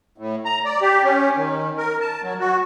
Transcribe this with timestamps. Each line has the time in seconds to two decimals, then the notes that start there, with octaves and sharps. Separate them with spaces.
0.18 A2
0.45 A#5
0.65 D5
0.81 G4
1.04 C#4
1.36 D#3
1.77 A#4
2.00 A5
2.23 F#3
2.39 F#4